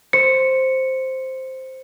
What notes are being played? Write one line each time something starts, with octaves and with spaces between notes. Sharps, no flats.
C5 C#7